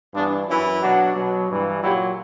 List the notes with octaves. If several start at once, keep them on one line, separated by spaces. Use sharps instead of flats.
G2 E3 B3 D4
F#2 E3 C#4 E4
B2 F#3 D4 F#4
B2 F#3
G2 E3
A#2 F#3 E4 G4